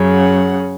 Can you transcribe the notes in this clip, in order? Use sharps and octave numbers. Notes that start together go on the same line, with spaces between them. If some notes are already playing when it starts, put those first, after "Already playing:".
Already playing: F#2 C#3
F#5